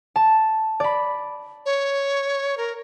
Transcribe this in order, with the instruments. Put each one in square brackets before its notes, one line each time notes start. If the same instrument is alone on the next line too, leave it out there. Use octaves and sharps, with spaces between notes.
[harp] A5
D5 B5
[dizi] C#5
A#4